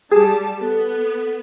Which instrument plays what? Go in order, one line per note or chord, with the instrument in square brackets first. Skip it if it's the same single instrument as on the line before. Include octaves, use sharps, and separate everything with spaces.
[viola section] G3 A5 [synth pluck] G#4
[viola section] B3 [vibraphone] A4